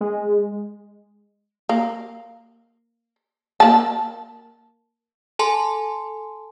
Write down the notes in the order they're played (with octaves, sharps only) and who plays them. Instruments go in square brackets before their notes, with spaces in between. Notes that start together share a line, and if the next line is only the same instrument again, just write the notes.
[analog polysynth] G#3
[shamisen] A#3
A#3 A5
[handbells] A4 G#5 A5 C6